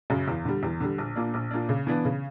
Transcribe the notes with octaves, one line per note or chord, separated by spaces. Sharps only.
F#2 C#3
E2
D3 G3
E2
D3 G3
A#1
A#2 A#3 D4
A#1
A#2 A#3 D4
C#3
E3 B3 D4
C#3